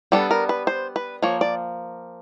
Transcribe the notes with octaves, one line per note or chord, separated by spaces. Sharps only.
G3 B3 D4 A4
A#4
B4
C5
B4
F3 A#3 C#5
D5